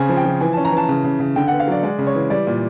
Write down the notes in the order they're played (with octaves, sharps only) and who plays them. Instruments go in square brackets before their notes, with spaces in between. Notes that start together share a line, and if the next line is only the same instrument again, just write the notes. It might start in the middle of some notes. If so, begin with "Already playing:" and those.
Already playing: [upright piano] C#3 C4 G#5
F3
G5
F3
E3 G#5
A5
C#4
A#5
E3 A5
C#3
C#3
C#3
D3 G5
F#5
B3
F5
F#3 D5
G#3 D5
C#3
C#5
E3
G3 D5
A#2